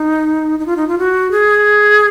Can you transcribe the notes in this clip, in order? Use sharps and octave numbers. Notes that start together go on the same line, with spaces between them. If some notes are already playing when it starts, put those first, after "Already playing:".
Already playing: D#4
D#4
F4
D#4
F4
F#4
G#4